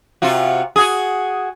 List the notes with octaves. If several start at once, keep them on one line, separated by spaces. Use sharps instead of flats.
C3 F4 F#4
F#4 G#4